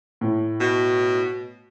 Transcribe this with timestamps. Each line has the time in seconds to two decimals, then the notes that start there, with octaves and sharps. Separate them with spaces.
0.21 A2
0.60 B2